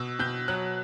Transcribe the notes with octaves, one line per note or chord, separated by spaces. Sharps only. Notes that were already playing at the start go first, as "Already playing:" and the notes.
Already playing: B2 E6
B2 G6
F#3 F#6